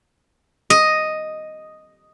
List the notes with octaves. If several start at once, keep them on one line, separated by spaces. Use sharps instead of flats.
D#5